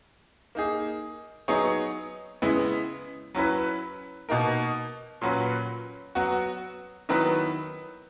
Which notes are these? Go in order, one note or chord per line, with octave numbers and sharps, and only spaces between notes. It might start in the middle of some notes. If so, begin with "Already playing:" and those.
A#3 D#4 G#4
F#3 B3 D#4 G#4 C#5
C#3 G#3 B3 E4
F#3 C#4 E4 B4
B2 A#3 D#4 A#4
A#2 F#3 C#4 F#4 B4
F#3 B3 F#4
D#3 F#3 B3 E4 B4